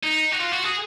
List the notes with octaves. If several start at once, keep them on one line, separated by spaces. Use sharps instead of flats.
D#4
F#4
F4
F#4
G#4